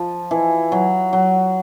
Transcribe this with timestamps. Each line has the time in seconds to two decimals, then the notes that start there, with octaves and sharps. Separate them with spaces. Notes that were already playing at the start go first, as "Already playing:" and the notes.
Already playing: F3
0.31 E3
0.72 F#3
1.13 F#3